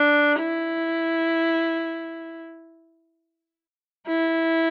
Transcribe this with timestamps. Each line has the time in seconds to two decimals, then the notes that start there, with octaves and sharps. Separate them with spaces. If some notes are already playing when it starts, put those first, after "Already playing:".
Already playing: D4
0.40 E4
4.08 E4